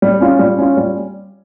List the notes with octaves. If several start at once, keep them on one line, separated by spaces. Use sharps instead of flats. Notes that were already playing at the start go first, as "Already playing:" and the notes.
G3
C#4 F4
G3
C#4 F4
G3